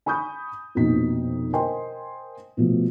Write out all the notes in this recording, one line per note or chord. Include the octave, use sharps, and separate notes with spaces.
G#5 B5 C#6 D#6 G6
A#1 F2 B2 D#4 B6
A#4 C5 D#5 G5 G#5 C6
B2 F3 A3